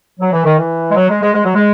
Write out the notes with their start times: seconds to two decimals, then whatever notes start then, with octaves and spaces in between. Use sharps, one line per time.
0.20 F#3
0.33 E3
0.45 D#3
0.58 E3
0.91 G#3
0.96 F#3
1.09 G#3
1.22 G#3
1.34 G#3
1.44 F#3
1.55 G#3